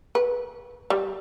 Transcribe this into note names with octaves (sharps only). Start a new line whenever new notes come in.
B4
G3